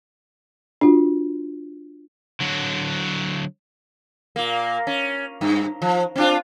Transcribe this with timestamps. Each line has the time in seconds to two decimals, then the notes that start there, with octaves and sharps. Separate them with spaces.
0.81 D4 F4 F#4
2.41 D3 F#3
4.36 A#2 A#3
4.87 C#4
5.41 G2
5.82 F3
6.16 C4 D4 F4